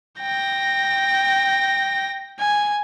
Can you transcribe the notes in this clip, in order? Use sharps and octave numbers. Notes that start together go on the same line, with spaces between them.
G5 A#6
G#5